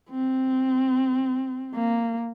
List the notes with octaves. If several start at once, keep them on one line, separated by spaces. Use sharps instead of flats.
C4
A#3